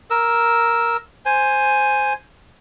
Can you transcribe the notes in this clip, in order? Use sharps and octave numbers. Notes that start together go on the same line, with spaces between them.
A#4 E6
C5 G#5